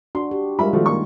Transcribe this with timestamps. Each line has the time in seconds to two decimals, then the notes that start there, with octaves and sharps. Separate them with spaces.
0.15 D4 F#4 C6
0.31 G4
0.59 G3 G#3 F4 A#4 E5 B5
0.73 D#3 F3 A3 F#4
0.86 A#3 C#6